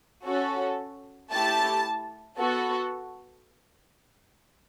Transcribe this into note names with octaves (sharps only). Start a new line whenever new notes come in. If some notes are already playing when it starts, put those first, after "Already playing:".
C#4 F#4 A4
A3 E4 G4 A5
B3 F#4 A4